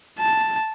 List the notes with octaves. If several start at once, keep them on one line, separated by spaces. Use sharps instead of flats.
A5